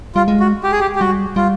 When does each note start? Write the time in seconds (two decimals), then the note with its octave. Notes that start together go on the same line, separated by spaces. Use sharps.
0.15 G3 F4
0.28 G#3
0.40 F#4
0.64 G4
0.72 G#4
0.80 G4
0.95 G4
1.00 G3 F#4
1.36 G3 F4